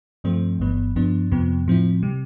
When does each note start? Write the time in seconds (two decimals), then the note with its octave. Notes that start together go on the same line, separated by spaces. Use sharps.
0.24 G2 F3 A3 C4
0.59 G1 G2 E3 B3
0.96 G2 F3 B3 D4
1.31 F2 C3 F3 B3
1.67 A2 F3 C4 E4
2.03 C3 G3